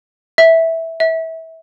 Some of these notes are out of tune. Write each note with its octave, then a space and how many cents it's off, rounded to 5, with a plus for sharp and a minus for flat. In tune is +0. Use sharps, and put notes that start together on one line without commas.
E5 -10
E5 -25